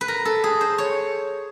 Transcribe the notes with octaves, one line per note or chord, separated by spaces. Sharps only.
B4
A#4
A4
G#4
C5
C#5